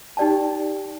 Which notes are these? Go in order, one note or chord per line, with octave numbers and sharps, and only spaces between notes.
D#4 G4 D5 G5 A5